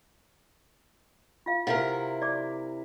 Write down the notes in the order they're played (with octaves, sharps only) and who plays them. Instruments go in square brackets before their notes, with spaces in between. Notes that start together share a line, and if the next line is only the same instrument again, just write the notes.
[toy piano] F4 F5
[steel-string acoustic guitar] C3 E4 A#4 [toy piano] F5 F#5
[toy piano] D5 D6